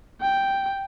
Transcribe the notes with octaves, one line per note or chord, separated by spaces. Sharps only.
G5